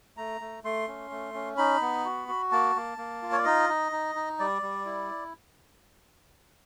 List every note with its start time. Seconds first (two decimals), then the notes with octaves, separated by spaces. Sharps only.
0.17 A3 A#5
0.41 A3
0.64 A3 C6
0.88 C#4
1.11 A3
1.34 C#4
1.57 D#4 B5
1.81 B3
2.05 F#4
2.28 F#4
2.52 A#3 A5
2.76 A#3
2.98 A#3
3.22 F4
3.32 C#5
3.38 D5
3.45 D#4 D#5
3.69 D#4
3.92 D#4
4.15 D#4
4.40 G3 D5
4.62 G3
4.85 E4